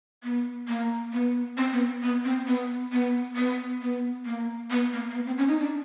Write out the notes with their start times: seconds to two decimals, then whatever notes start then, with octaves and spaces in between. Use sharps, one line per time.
0.23 B3
0.68 A#3
1.13 B3
1.57 C4
1.72 B3
2.03 B3
2.24 C4
2.46 B3
2.92 B3
3.36 B3
3.81 B3
4.25 A#3
4.70 B3
4.93 A#3
5.09 A#3
5.15 B3
5.26 C4
5.38 C#4
5.48 D#4
5.60 D4